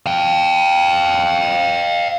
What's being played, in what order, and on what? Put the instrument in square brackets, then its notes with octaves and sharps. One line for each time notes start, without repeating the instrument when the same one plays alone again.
[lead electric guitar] F5 G5